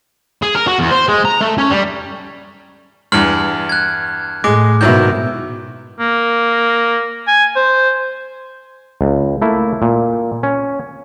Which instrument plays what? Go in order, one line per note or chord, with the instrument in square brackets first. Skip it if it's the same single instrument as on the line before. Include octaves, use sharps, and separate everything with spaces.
[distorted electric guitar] G#4
A#4
F#4
E2
C5
G#3
A#5
A3
C#4
G3
[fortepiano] E2 G2 [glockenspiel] F6 F#7
[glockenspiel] F#6 G#6
[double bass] A2 [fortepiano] G#3 [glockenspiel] D6
[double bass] G#2 B2 [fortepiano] D#3 F#3 E4 [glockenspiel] G6
[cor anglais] A#3
G#5
C5
[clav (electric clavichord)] C#2
A3 A#3 E4
A#2
C#4